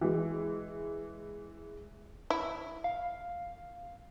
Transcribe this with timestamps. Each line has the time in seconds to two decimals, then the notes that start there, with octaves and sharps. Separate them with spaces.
0.01 E3 G#3
2.30 E4
2.84 F5